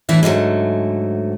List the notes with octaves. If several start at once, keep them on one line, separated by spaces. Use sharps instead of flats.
A2 E3 D4 E4
G#2 D3 F#3 A3